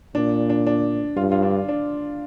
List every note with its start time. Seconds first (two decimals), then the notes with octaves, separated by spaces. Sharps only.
0.15 A#2 D4
0.50 D4
0.67 D4
1.16 G2 F4
1.32 F4
1.43 D4
1.69 D4